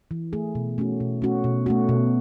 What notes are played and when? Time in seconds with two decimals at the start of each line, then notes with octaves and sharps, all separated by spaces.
0.11 E3
0.33 A3 E4 G#4
0.55 B2
0.78 A3 C#4 F#4
1.00 B2
1.22 A3 C#4 F#4
1.44 B2
1.66 A3 C#4 F#4
1.89 B2